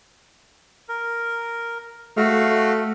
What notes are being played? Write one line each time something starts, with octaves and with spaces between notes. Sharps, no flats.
A#4
A3 F#4 F5